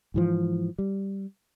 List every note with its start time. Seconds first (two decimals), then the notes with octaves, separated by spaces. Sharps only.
0.14 G#2 E3 F3
0.79 G3